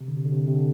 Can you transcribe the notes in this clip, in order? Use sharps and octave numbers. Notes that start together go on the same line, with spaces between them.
C3
D3
C3
D3
C3
D3
C3
D3